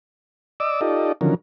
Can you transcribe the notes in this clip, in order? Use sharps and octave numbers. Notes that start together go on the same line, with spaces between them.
D5 D#5 D6 E6
D#4 F4 G4 A4 D5 D#5
D3 D#3 F3 F#3 C#4 A#4